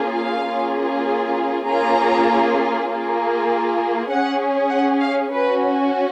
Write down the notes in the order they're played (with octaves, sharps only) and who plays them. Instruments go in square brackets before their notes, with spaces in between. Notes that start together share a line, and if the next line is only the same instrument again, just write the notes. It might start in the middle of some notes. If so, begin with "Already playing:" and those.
Already playing: [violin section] A#3 C#4 F4 G#4
F5
A#3 C#4 F4 G#4
A#3 C#4 F4 G#4 A#5
A#3 F4 G#4
C#4 G#4 F#5
F#5
F5
C#4 F#4 B4